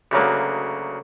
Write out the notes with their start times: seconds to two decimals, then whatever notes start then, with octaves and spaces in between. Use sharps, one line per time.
0.11 D2 C#3 F#3 A#3